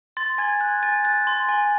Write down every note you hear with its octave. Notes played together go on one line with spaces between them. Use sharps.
C6 A6
G#5 G#6
F#6 G#6
G#5 A6
F#6 A6
C6
G#5